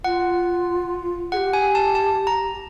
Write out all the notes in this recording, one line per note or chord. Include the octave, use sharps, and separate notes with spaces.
F4 F#5
G4 G#4 F#5
G#5
A5
A5
A#5